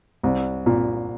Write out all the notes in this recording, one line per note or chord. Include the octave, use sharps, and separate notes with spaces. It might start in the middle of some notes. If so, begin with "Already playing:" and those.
C2
A#2